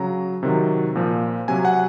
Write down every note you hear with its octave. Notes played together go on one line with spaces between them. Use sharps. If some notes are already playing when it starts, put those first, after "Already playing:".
Already playing: C#3 F#3 A#5
C3 D#3 F#3
A#2 F3
C3 F#3 G#5
F#5